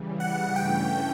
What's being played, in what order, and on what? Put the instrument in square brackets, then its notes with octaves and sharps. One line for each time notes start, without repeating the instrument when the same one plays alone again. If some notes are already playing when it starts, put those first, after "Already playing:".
Already playing: [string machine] C#3 E3 G3
[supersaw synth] F#5
[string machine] G2 E3 A3 C#4 [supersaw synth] G5